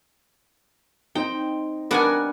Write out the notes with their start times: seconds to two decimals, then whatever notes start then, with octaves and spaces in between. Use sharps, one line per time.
1.15 C4 D#4 G5
1.91 G3 B3 D4 A#4 F#5 G#5